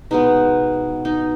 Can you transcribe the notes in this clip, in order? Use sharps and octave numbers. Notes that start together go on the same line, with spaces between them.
B2 G#3 B3 D#4
D#4